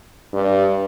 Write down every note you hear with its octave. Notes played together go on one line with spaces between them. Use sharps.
G2